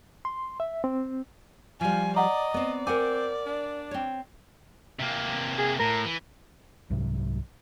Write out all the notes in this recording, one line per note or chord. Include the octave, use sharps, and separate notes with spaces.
C6
E5
C4
F3 G3 F4 G#5
D5 D#5 F#5 A#5
B3 C4 D5
C4 A#4 F#5 G#5 D6
D4
C4 C#5
C3 A#3
G#4
A2 A#4
E3
C2 G#2 C3 F#3